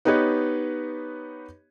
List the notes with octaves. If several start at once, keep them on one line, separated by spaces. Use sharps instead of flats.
B3 D#4 G4 B4 C#5